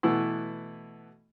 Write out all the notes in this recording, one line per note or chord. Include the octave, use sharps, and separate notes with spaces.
B2 E3 A3 B3 E4